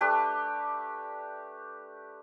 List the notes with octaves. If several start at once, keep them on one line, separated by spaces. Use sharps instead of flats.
A3 D4 G4 B4